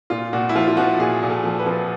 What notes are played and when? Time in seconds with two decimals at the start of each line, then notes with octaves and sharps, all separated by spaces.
0.10 A#2 F4
0.33 A#2 F#4
0.49 E4
0.55 F3 F4
0.68 F4
0.77 F3 F#4
0.99 A#2 G#4
1.23 A#2
1.30 A4
1.44 F3
1.59 B4
1.66 F3